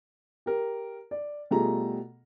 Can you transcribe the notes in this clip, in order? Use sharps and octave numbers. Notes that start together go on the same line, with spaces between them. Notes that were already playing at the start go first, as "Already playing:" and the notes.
G4 A#4
D5
B2 G3 A3 F4 G#4 A#5